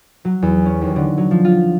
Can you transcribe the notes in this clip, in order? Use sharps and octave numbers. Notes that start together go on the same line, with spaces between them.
F#3
E2
C#4
D#2
D3
F#3
F3
F4